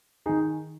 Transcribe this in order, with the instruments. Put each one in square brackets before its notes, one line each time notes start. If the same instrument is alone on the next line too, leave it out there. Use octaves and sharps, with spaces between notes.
[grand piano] D#3 D#4 G#4